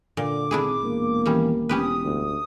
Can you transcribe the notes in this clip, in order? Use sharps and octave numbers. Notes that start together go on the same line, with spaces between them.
A#2 D3 D6
G#1 D4 E4 G#4
E1 A#3
D#3 E3 G3 C#4
E1 C#4 G4 B4 D#6
D2